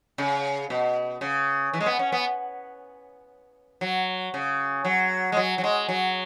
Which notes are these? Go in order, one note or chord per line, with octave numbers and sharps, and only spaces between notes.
C#3
B2
C#3
E3
G#3
B3
C#4
B3
F#3
C#3
F#3
G#3
F#3
F#3
G#3
F#3